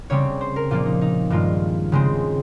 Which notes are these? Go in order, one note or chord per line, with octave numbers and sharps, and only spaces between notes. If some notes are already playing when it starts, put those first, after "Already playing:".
C#3 G3 C4 C#5
C5
A#4
A#2 F3 A#3 F4
D#4
D#4
G2 D#3 G#3 F4
C#3 G#3 C4